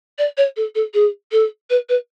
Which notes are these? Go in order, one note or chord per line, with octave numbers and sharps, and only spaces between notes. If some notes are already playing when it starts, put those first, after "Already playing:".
D5
C#5
A4
A4
G#4
A4
B4
B4